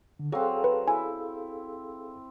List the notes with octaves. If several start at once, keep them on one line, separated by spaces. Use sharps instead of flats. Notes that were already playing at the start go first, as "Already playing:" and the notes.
D3
F#3 C4 G#4 A4 F5
B4
E4 G#5